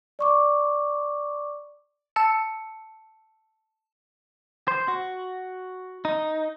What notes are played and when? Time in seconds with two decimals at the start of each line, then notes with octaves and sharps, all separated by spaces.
0.19 D5 C#6 D6
2.16 A5 E6 C#7
4.68 C5
4.88 F#4
6.05 D#4